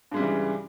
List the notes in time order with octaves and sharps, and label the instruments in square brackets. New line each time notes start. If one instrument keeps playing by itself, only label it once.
[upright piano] G2
G#3
G3
C#3
E3